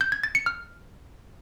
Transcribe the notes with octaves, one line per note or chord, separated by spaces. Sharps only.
G6
G#6
A6
C#7
F6